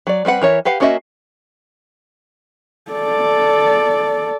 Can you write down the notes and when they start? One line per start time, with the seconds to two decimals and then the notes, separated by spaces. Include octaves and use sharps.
0.07 F#3 D5
0.25 G3 C4 B4 F#5
0.42 E3 A#4 C#5 E5
0.65 G4 B4 F5 F#5
0.80 A#3 C#4 F#4 D#5 E5
2.91 A4 D5